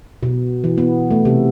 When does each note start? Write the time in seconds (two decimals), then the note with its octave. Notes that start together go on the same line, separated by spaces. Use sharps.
0.23 B2
0.64 E3
0.78 B3
1.11 A3
1.25 C3